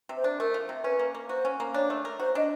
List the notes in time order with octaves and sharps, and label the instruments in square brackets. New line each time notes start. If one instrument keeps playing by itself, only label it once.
[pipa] C3
[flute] C5
[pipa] D4
[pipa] A3 [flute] A#4
[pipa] F3
C3
[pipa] C#4 [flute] B4
[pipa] A#3
A#3
[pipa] F#4 [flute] C5
[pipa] C#4
A#3
[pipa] D4 [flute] C#5
[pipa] A3
A#4
[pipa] F#4 [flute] C5
[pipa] D4 [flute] D#5